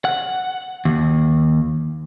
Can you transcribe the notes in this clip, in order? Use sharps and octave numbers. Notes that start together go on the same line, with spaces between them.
F#5
D#2